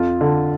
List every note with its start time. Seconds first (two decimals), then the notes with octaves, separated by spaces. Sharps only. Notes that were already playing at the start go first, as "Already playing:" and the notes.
Already playing: F2 F4
0.21 D3